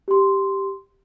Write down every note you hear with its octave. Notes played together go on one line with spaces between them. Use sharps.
G4 C6